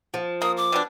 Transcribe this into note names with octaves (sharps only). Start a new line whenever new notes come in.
F3
A#3 D#6
D6
B2 G3 D4